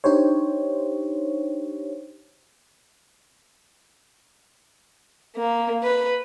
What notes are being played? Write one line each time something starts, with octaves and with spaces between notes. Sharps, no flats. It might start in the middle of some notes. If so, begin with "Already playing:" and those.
D4 D#4 G4 C5 C#5
A#3
B4